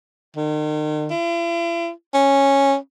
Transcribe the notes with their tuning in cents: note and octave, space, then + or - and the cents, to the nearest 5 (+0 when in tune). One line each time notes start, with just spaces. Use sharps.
D#3 -40
E4 +45
C#4 -5